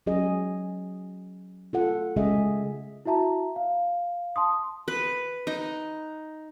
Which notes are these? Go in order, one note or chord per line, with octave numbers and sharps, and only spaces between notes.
F#3 C#4 G#4 D#5
F4 A4 F#5
C#3 G#3 C#4 G#4 D#5 E5
E4 F#4 E5 A5 A#5
F5
A5 C6 D#6
B4
D#4